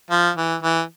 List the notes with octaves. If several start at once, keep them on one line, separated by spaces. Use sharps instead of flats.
F3
E3
E3